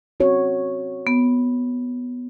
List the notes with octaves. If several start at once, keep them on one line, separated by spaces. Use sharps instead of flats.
C4 F#4 C#5
B3